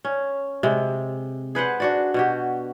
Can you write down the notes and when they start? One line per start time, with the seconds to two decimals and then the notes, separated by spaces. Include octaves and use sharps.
0.05 C#4
0.63 C3 G#3
1.55 G#4 B4 C5 F#5
1.80 D4 F#4 D5
2.14 B2 F#4 G4